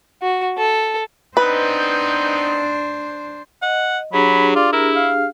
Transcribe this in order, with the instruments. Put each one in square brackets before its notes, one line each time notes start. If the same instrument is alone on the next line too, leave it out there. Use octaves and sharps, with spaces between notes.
[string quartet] F#4
A4
[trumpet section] B3 C4 D#4 [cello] D4 C5 [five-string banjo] B4
[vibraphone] D#5 [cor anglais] F#5
[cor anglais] F#3 [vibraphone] D4 G4 G#4 [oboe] B5
[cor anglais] F4 [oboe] D5
[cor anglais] E4 [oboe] A#4
[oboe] F5